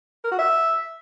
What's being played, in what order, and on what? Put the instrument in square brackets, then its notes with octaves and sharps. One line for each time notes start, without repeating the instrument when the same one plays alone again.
[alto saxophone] A#4
F#4
E5